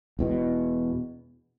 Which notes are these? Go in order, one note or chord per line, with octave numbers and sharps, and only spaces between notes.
E1 E2 B2